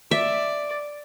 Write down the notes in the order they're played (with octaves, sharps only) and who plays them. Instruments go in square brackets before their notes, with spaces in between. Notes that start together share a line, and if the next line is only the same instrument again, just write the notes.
[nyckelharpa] D5 [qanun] E5